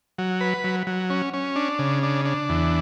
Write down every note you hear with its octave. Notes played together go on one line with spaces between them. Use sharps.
F#3
B4
F#3
F#3
C#4
C#4
D4
C#3
D4
D4
E2